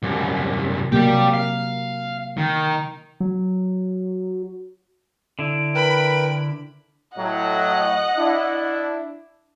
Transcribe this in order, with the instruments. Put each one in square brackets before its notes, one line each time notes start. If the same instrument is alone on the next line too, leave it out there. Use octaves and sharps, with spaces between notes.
[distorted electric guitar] C2 F#2
[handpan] C3 F#3 A#3 [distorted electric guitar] G3 G4
[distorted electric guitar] F5
D#3
[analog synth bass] F#3
[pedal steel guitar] D3 E4 [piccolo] D7
[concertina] A#4 B4 G5 [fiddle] B5
[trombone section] A2 F#3 [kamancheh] D#5 F#5
[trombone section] D4 E4